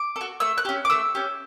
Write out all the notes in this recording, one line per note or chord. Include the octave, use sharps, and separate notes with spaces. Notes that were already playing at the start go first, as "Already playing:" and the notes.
Already playing: D6
A4
F#4
A3 E6
F#6
C#4 G4
D6
A3 E6
C#4 G4